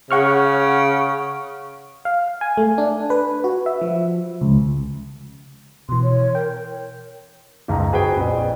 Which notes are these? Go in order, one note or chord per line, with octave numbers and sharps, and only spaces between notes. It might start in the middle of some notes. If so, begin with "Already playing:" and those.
C#3 F#5 C#6 F6
F5
G#5
A3
D4
B4
F#4
E5
F3
C#2
B2 E3 C6
C#5
A#4 G5
F#1 C#2 G#2 A5 A#5
F#4 G#4 B4 C5 G5
A#1 F2